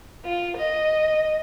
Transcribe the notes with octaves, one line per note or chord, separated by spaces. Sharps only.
F4
D#5